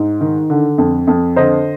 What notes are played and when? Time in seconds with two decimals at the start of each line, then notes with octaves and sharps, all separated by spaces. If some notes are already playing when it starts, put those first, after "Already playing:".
Already playing: G#2
0.21 D#3
0.50 D3
0.78 F2
1.07 F2
1.36 D3 C5 D#5